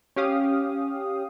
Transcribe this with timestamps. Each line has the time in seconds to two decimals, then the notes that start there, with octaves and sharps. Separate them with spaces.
0.16 C#4 G4 F5 D#6